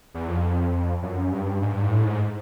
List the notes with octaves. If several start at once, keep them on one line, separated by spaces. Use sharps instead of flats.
E2
F2
F#2
G2
G#2
G2
G#2
A2
G#2